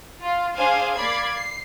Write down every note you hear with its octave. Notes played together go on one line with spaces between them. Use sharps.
F4
D4 G#4 C5 F5 G#5
A#3 D5 B5 G#6 C7
C7